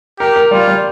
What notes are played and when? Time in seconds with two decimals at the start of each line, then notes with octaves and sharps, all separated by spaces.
0.19 G4 A#4
0.36 A#4
0.51 G3 F4
0.68 G3